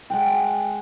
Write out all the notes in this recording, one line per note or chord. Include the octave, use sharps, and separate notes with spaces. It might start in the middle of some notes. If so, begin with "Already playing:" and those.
G#3 F#5 G5